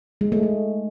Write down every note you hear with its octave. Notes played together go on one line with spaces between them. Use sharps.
G#3
A3
A3